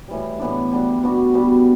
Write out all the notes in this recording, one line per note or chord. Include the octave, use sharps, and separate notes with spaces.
A2 E3 G3
A2 E3 B3 D4
D3 G3 D4
B2 G3 D4 F#4
B2 G3 B3 D4